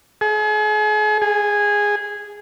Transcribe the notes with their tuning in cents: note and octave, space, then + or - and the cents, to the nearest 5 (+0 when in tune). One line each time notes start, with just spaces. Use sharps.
G#4 +40
G#4 -10